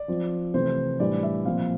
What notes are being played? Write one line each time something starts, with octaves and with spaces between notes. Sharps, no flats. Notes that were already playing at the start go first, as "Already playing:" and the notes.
Already playing: D5
F3 C4 F4
C3 E3 A3 C5
A2 E3 G3 D4 D5
E5
A#2 F3 C4 F5